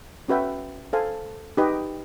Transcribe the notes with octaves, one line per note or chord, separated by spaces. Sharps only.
C#4 F#4 B4 E5 G5
A4 C5 F5 G#5
D#4 G4 B4 D#5